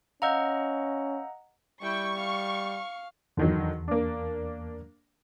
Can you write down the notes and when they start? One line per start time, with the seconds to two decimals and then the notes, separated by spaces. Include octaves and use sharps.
0.22 C#4 D#5 F5 F#5 A#5 E6 G6
1.82 G3 E4 G5 C#6
2.18 F5
3.37 E2 D3 D#3 F#3
3.88 A#3 D4